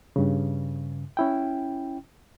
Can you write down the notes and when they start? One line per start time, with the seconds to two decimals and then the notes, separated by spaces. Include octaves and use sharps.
0.16 G2 C#3
1.17 C#4 E4 G5